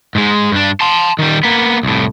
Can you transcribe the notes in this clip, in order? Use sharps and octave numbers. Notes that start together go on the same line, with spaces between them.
G#2 G#3
G2 D4
A5 C6
D#3 G3
A#3 B3
C2 A2